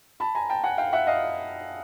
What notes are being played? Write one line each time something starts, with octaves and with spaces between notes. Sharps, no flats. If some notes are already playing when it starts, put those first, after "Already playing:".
A5 B5
G#5 A#5
G5 A5
F#5 G#5
F5 G5
E5 F#5
D#5 F5